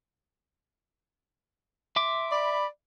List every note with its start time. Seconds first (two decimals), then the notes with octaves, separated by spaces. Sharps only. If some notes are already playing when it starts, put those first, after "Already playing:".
1.96 E5 C6 D6
2.30 D5 B5